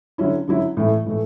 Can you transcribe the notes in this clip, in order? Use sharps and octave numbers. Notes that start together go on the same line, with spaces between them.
D3 F#3 C#4 E4
D3 F#3 C#4 E4
A2 E3 A3
A2 E3 A3